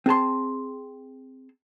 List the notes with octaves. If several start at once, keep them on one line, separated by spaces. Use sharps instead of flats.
C4 G#4 A5 C6